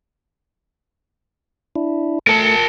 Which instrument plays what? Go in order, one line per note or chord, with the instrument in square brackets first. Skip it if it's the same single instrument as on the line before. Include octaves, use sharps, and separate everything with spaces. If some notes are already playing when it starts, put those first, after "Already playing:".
[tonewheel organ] D4 E4
[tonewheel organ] A3 [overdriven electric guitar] A#4 A5